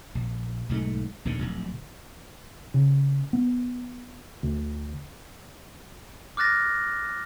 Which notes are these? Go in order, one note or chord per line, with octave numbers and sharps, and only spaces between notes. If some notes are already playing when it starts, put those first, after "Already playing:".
A#1
B1 G#2 G#3 A3
A#1 D#2 A2 D3
D1 A#1
C#3
B3
D2
D6 F6 F#6 A6 A#6